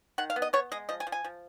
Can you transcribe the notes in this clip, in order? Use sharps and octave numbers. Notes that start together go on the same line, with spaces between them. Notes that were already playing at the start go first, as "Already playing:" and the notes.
D#3 F#5
F5
B3
D#5
B3 C#5
G#3 D#5
F3 D#5
G#5
F3
G#5
F3